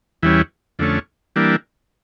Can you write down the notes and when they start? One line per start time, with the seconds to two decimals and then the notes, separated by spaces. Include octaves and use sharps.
0.23 E2 E3 G3 C#4
0.79 F2 D3 A3 C#4
1.36 E3 G3 A#3 D4